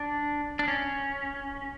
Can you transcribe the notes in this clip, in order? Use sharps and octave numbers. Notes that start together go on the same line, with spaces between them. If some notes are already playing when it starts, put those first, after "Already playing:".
Already playing: D4
D4
C#4